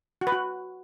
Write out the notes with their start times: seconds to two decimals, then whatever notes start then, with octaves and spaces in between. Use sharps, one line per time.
0.21 F#4
0.27 B4
0.32 F#4